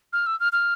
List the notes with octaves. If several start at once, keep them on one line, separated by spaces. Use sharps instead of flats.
F6
E6
F6
F6